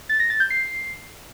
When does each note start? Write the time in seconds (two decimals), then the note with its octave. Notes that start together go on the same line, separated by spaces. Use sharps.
0.09 A6
0.20 A#6
0.30 A6
0.40 G6
0.50 C7